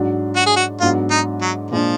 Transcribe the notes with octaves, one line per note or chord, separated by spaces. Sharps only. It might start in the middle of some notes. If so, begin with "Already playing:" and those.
Already playing: G#2 F#3 D4
F#4
G#4
F#4
G#2 F#3 B3 D4 F4
D#4
F#3
A#2 F3 G#3 D4